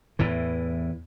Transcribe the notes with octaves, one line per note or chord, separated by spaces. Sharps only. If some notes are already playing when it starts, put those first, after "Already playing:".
E2 A2 E3